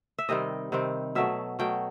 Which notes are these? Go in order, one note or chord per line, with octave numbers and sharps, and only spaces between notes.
E5
C3 D#3 G3 C4 D#5
C3 D#3 G3 C4
B2 F#3 A3 E5
B2 F#3 A3 G5